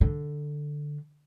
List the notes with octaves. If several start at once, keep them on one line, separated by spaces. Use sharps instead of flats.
D3